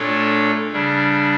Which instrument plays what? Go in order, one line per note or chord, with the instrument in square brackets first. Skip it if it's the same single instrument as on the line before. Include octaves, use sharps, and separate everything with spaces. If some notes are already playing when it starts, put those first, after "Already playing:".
Already playing: [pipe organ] A#2 A3 D4 A4 C#5
C#3 G3 D4